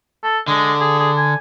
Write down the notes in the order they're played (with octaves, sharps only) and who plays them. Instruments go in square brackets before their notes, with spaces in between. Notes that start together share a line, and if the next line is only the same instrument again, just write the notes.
[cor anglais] A4
[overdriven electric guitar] D3 [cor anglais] G#3
[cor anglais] G#4
G#4
G#5